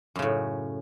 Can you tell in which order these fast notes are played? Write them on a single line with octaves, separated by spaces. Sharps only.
F#2 C#3 A2